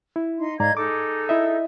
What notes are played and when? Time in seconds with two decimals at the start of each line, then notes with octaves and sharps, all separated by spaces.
0.16 E4
0.38 D#4 C6
0.60 G#2 D5 D#5 F5 A#5 G#6
0.77 D#4 G#4 A4 D6
1.29 E4 D#5 E5